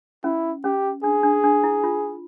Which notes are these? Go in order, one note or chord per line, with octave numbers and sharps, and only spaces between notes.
C#4 E4
C#4 G4
D4 G#4
D4
D4
E4
F4